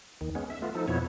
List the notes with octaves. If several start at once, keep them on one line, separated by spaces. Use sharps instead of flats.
D#2 D#3
G#3 B3 C#4
E5
A3 B3 F4
F3 D#4 A4
F2 B2 F3 B3 E4 C#5